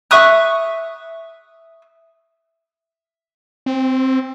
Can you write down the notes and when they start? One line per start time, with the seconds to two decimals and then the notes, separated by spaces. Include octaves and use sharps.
0.11 E5 C#6 D#6 F#6
3.66 C4